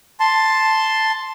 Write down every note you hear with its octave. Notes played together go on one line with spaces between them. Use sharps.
A5 C6